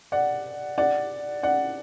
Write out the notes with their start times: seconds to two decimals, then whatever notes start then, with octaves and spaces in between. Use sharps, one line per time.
0.12 D5 F#5
0.78 D5 F#5
1.43 D5 F#5